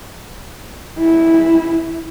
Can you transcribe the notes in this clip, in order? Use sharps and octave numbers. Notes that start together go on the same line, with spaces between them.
E4